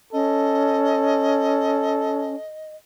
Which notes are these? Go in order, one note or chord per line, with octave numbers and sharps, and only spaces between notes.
C#4 A4 D#5